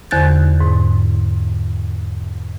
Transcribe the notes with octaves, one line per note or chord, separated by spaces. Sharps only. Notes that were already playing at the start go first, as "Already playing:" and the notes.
E2 D3 C5 F#6 G6 A6
G#2